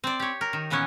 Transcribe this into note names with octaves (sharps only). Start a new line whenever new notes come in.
C4 C5 D5
G4 C#5
A#4
D#3
A#2 E3 B3 C#4 C#5